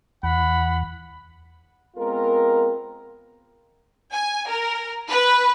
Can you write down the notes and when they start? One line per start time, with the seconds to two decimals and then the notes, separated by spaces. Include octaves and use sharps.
0.23 E2 F#5 B5
1.97 G#3 B3 C4 F4 A#4
4.13 G#5
4.48 A#4
5.08 B4